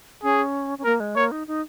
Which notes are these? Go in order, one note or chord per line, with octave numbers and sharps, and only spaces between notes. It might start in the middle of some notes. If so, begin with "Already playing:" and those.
C#4 G#4
C#4
A#3 A#4
G#3
A#3 C#5
D#4
D#4